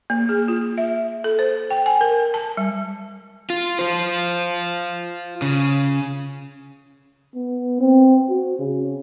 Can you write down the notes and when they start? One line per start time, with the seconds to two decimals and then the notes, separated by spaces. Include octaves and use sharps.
0.10 A#3
0.29 G#4
0.48 F4
0.78 E5
1.24 A4
1.39 C5
1.70 G5
1.86 G#5
2.01 A#4
2.34 A5
2.57 G3
3.50 F4
3.79 F4 C5
5.42 C#3
7.35 B3
7.80 C4
8.29 F#4
8.59 C#3